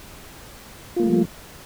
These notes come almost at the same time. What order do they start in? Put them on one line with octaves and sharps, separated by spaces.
F4 A#3 A3 G3 F3